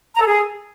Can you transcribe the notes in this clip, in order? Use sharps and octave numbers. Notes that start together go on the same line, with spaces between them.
A#5
A4
G#4